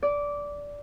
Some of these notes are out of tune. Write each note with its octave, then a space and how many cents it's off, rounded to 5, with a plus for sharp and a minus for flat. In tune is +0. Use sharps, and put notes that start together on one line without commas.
D5 -15